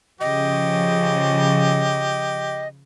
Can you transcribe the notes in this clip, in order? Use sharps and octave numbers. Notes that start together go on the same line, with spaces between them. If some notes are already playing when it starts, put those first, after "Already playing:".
C#3 F3 G4 D#5